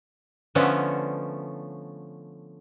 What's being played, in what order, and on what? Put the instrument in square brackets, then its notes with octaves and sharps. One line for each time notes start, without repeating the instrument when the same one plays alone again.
[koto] D3 F3 A3 B3 C#4